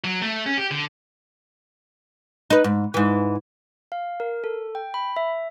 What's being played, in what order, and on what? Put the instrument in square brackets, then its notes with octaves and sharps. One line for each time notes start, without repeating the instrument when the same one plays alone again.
[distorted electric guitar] F#3
A3
C#4
G4
D3
[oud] D#4 B4
G#2
G#2 E3
[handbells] F5
A#4
A4
G5
B5
E5